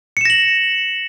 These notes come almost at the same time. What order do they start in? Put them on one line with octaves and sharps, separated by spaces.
C#7 E7 A#6 F#7